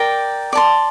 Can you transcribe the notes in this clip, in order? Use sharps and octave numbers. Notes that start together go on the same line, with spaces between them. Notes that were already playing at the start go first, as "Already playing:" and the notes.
Already playing: A#4 D5 G5
D5 A5 C6